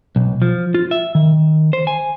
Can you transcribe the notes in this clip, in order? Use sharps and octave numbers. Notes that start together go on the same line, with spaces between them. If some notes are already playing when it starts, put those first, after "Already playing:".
B1
F3
F4
E5
D#3
C5
G#5